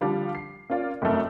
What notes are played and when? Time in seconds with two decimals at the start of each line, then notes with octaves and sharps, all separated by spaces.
0.01 D3 F3 G3 F4
0.35 C7
0.70 A#3 C#4 F4 D5
1.02 F1 F#2 A3 A#4